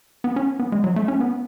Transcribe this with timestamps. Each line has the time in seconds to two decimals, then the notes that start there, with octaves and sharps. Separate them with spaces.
0.24 B3
0.36 C#4
0.59 B3
0.72 G#3
0.84 F#3
0.96 A3
1.08 C#4
1.20 B3